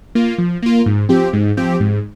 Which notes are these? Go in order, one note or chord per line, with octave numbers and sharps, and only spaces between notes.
A#3 F4
F3
A#3 F4
G#2
F3 C4 G4
G#2
F3 C4 G4
G#2